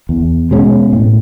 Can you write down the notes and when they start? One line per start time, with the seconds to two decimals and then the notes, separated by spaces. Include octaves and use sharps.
0.09 E2
0.51 B2 G#3 C#4
0.93 A2